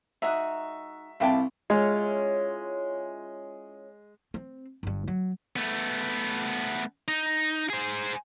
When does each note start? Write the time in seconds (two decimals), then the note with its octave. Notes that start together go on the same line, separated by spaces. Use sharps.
0.22 F#3 G#3 D#4 F#4 E5
1.20 C2 D3 E4 F5 G5 A5
1.70 G#3 C#4 E4 F4
4.34 C4
4.83 G1 G2
5.08 F#3
5.56 A3 B3
7.08 D#4
7.70 G#4 C5